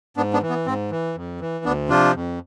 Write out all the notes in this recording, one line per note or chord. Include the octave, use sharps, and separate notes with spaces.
G#2 B3 D4
B3 D4
E3
B3
G#2 C4
E3
F2
E3
D2 B3 D4
C3 F3 D4 F4
F2